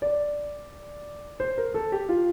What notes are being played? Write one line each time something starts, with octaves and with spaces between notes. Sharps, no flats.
D5
C5
A#4
A4
G4
F4